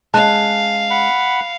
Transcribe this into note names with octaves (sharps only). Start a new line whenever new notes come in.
G#3 C#4 F5 A5 F#6
F#5 B5